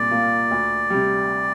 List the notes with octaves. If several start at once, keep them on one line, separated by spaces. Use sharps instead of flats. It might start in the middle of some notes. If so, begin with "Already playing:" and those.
Already playing: C2 A#2 A#3 D5
A#2 A#3 F4
D2
C3 G3